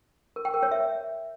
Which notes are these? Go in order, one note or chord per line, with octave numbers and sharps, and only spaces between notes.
A#4
G5
A#4
C#5
E5